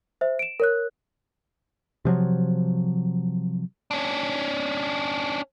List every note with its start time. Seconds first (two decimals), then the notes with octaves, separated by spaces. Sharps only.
0.21 C5 E5
0.39 D7 E7
0.60 A#4 C#5 F#6
2.05 C3 F3 F#3
3.91 C#4 D4